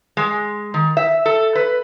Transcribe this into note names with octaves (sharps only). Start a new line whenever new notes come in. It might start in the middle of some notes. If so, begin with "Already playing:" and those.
G#3
D#3
E5
A4
B4